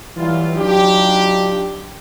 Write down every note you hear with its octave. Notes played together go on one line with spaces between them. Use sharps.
E3 F#3 G3 F4
F#3 D4 D#4 F4 G4